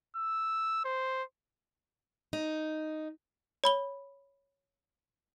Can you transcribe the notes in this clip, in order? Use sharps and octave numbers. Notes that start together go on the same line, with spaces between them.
E6
C5
D#4
C#5 B5 G7